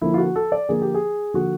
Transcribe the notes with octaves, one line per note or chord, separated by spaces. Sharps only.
D3 F3 A#3 E4
F4
F#4
A4
D5
D3 F3 A#3 G#4
G4
G#4
D3 F3 A#3 F#4